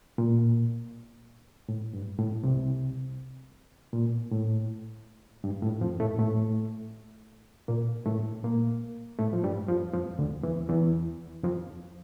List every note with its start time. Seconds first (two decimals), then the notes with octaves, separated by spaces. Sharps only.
0.18 A#2
1.69 A2
1.93 G2
2.18 A2
2.43 C2 C3
3.93 A#2
4.31 A2
5.44 G2
5.62 A2
5.81 F2 F3
6.00 A2 A3
6.19 A2 A3
7.68 A#2 A#3
8.06 A2 A3
8.43 A#2 A#3
9.19 A2 A3
9.33 F3
9.44 G2 G3
9.69 F2 F3
9.94 F2 F3
10.19 D2 D3
10.43 E2 E3
10.69 E2 E3
11.44 F2 F3